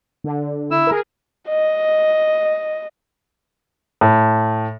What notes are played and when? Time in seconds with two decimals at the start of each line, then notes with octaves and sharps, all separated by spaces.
0.24 D3
0.71 E4 E6
0.87 G#4 A#4
1.48 D#5
4.01 A2